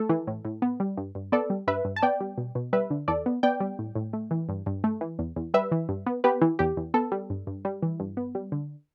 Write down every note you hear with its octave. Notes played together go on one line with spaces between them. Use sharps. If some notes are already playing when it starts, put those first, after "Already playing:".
Already playing: A3 A4
E3
A2
A2
B3
G3
G2
G2
B3 A4 D5
G3
G2 B4 E5
G2
A5
B3 D5 G5
G3
B2
B2
G3 B4 E5
D3
E2 A4 D5
B3
B3 D5 G5
G3
A2
A2
A3
E3
G2
G2
A3
E3
E2
E2
G3 B4 E5
E3
G2
B3
B3 G4 B4
E3
E2 G4
E2
B3 A4
G3
G2
G2
G3
E3
G2
B3
G3
D3